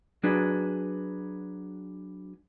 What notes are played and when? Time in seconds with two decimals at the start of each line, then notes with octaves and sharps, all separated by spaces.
0.23 F#3 D4 F#4 G#4 B4